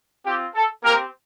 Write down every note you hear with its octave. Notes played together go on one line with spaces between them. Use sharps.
C4 F4 G4
A4
A#3 C4 G4 A#4